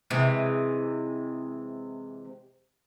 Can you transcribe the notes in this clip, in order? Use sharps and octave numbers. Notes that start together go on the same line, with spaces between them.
C3 E3 G#3